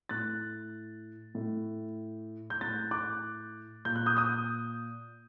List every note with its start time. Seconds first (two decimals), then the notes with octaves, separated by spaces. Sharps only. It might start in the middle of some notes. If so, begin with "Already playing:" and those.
0.09 A2 F#6 A6
1.35 A2
2.50 G6
2.61 A2 F#6 A6
2.91 D6 F#6
3.85 A#2 G6
3.96 F#6
4.06 D#6 G6
4.17 D#6 G6